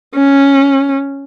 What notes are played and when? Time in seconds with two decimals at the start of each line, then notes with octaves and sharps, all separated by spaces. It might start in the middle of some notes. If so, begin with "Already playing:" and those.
0.15 C#4